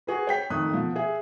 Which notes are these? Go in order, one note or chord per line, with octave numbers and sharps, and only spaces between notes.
F#4 G#4 B4
C#5 G5 B6
F2 D#3 A3 D#6 F#6
B2 F3
G#4 E5